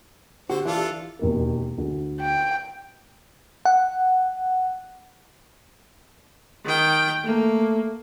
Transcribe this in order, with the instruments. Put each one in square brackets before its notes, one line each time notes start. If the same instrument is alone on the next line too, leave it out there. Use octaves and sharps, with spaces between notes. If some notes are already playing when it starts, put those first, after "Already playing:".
[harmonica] D3 C5 [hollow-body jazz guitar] F#4 [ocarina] G4
[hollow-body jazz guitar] E3 [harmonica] D4 F4 A4
[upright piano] E1 D#2 A#4
D2
[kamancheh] G5
[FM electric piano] F#5
[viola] D#3 G5
[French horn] A3 [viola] A#3